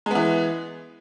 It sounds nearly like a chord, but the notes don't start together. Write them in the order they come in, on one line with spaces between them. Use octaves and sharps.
G#3 B3 E3